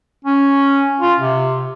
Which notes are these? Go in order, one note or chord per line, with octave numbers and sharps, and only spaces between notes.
C#4
F4
C3